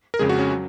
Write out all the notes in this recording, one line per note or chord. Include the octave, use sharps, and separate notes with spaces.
A#4
F2 C#3 G#3 G#4
F#4
C#4
F#3